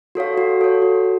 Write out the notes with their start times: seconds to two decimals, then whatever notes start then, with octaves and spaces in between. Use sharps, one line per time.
0.15 F#4 A4 C#5 F5
0.38 F#4
0.61 A4 C#5
0.82 F#4